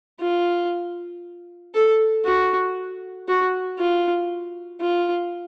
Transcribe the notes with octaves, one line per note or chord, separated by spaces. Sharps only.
F4
A4
F#4
F#4
F4
F4